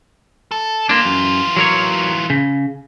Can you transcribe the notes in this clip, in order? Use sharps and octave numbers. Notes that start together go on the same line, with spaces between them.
A4
E3 A#3 D4 F4
F#2
F#3 A#4 C#5
C#3